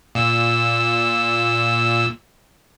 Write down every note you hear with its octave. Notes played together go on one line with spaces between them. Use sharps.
A#2 E6